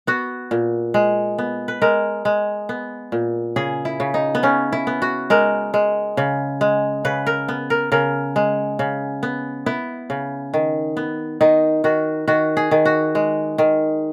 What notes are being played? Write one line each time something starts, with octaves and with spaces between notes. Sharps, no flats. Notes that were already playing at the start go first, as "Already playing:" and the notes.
B3 F#4
A#2
G#3
B3
B4
G#3 A#4
G#3
B3
A#2
C#3 G#4
E4
C#3
D#4
B3
C#3 C#4
E4
B3
F#4
G#3 A#4
G#3
C#3
G#3
C#3 B4
A#4
B3
A#4
C#3 A#4
G#3
C#3
B3
B3 E4
C#3
D#3
B3
D#3 D#4
D#3 F#4
D#3 F#4
G#4
D#3
F#4
G#3
D#3